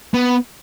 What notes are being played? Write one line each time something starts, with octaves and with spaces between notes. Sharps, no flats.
B3